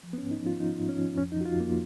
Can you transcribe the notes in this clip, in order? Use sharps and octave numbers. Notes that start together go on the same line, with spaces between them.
F3
B3
C#4
G#2
D#4
F3
F4
F3 D#4
G#2
C#4
F3
F2 C#4
D#4
F3 F#4
F4
F2 A#3